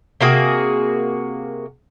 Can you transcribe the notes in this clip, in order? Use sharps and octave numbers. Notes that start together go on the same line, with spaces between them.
C3 A#3 F#4 G#4